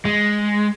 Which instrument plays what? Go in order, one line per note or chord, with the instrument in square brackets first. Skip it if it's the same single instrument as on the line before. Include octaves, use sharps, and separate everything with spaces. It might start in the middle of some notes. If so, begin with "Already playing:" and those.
[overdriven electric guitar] G#3